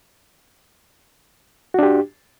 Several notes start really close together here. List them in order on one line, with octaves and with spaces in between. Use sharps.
F#4 D4 G4